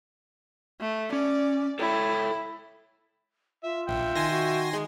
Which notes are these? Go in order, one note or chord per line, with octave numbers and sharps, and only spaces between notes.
A3
C#4 D5
E4 A4 C#5 G5
F4 E5
A#1 E5 G5
D#3 G#5 C6 A#6
F#4
G#3 G#4